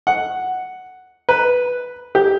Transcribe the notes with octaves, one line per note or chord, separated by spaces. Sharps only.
F#5
B4
G4